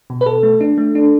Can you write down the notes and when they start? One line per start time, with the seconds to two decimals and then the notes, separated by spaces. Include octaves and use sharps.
0.10 B2
0.21 B4
0.26 B2 A4
0.43 A3
0.61 D4
0.78 A3
0.95 D4